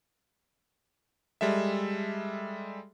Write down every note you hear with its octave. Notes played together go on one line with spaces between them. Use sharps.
G3 G#3 A4 E5